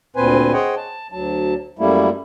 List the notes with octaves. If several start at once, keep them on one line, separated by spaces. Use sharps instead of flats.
D2 A#2 C4 B4 C5 G#5
G#4 C5 C#5 D#5 F#5 G5
A5
D2 F#3 A5
F#2 G3 A3 A#3 E4